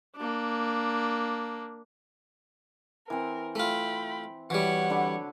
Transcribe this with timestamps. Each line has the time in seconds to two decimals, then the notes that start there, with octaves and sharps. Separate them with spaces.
0.16 A#3 D4
3.10 E3 C4 A#4
3.55 A3 F4 G5 B5
4.50 E3 G3 F#4 C#5 F#5
4.90 D3 B5 D6